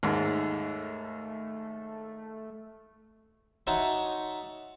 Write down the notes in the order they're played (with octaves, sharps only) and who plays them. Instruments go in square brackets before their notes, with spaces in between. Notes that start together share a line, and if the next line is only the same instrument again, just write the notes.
[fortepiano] D#2 G#2 [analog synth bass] A3
[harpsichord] D#4 F#4 C#5 E5 A5 C6